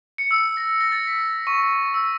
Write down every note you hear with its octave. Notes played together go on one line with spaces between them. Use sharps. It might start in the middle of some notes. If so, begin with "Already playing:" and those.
C#7
E6
A#6
A#6
A6
B6
C#6
E6